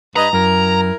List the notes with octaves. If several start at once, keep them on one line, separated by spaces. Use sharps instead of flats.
G2 B4 D#5 A#5
F#2 E4 A#4